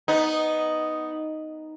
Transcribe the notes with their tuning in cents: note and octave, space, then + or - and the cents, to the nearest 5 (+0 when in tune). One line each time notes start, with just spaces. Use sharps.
B3 +0 D#4 +0